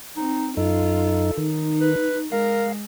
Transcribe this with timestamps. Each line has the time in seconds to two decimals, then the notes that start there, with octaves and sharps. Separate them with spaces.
0.16 C4 D#4
0.57 F#2 D#4 F4 A4
1.38 D#3 D#4
1.81 B4
2.32 G#3 A#4 F5